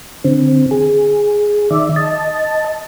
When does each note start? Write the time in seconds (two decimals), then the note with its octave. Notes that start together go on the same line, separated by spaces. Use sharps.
0.24 D3 C4
0.71 G#4
1.70 D#3 D5 E5
1.96 D#5 A5